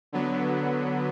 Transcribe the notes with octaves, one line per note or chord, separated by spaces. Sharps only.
D3 F#3 B3